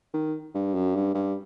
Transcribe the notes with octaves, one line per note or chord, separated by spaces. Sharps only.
D#3
G2
F#2
G2
G2